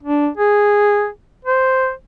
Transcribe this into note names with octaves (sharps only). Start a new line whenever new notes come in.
D4
G#4
C5